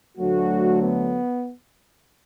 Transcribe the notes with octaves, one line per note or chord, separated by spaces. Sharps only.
D2 D3 F#3 A3 F#4
B3